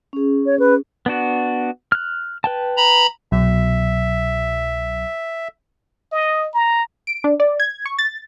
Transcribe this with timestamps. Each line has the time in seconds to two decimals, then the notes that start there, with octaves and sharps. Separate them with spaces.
0.13 C#4 G#4
0.46 C#5
0.59 B4
1.06 B3 D4 F#4
1.92 F6 F#6
2.44 B4 G5 A5
2.77 A#5 B5
3.32 C2 B2 F#3 E5
6.12 D#5
6.54 A#5
7.07 D7
7.24 D4
7.40 D5
7.60 G#6
7.86 C#6
7.99 A6